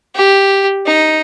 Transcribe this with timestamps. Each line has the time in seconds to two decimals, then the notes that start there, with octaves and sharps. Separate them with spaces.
0.15 G4
0.86 D#4